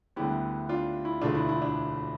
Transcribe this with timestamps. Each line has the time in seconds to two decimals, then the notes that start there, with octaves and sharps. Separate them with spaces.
0.16 D2 D3 G3 B3 E4 G4
0.69 D4 F4
1.05 E4
1.22 E1 D2 D3 A3 D4 F4
1.35 E4
1.49 E4
1.62 D4